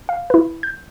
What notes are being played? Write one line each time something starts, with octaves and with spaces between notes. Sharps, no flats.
F5
E4 B4
G6